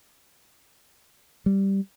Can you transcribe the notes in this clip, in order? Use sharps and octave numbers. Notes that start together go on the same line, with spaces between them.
G3